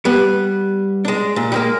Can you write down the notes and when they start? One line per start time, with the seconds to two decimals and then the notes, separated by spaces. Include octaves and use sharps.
0.05 G3 B3
1.05 G#3 D4
1.36 A#2
1.52 G3 G#3 A#3